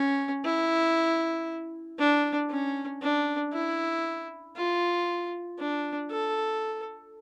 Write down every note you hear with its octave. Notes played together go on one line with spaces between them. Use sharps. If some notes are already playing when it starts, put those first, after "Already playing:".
Already playing: C#4
E4
D4
C#4
D4
E4
F4
D4
A4